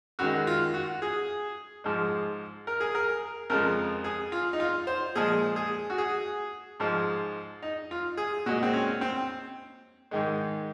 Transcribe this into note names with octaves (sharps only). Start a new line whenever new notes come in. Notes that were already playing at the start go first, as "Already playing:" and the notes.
F#2 D#3 G#3 F#4
F4
F#4
G#4
G#2 F3 G#3
A#4
G#4
A#4
F2 C#3 F3 G#3 A#4
G#4
F4
D#4
F4
C5
A#2 F3 G#3 G#4
G#4
F#4
G#4
G#2 F3 G#3
D#4
F4
G#4
A#2 G#3 F#4
C4
C#4
C4
G#2 D#3 G#3